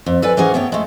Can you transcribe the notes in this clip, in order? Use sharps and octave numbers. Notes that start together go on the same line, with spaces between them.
F2
A4 B4 D5 G#5
G#2 E3 C#4 G#4 A#4 F#5
A3 B3 C#5 G5
G#3 A3